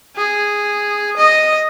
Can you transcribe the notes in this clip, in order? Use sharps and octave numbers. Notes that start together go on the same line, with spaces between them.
G#4
D#5